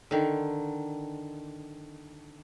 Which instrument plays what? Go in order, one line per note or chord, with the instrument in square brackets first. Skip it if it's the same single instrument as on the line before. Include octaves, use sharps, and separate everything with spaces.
[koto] D3 D#3